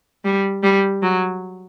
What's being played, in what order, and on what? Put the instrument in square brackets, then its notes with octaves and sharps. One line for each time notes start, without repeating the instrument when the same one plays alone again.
[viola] G3
G3
F#3